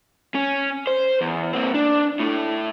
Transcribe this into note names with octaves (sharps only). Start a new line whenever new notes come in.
C#4
C5
E2
A#3 C4
D4
A2 A3